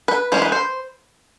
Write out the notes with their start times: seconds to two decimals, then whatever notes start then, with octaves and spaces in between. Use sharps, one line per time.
0.08 B4
0.32 E3 G#3 C#4 C5
0.42 B4
0.52 C5